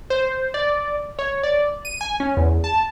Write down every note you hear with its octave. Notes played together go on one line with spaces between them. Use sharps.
C5
D5
C#5
D5
D#7
G#5
C#4
E2
A5